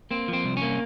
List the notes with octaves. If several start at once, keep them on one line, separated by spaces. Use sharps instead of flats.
A#3 C4
F3
C4
C2
A#3 C#4